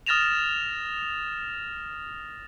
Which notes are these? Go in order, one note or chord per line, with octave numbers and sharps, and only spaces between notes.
D#6 F6 A6 A#6 E7 F7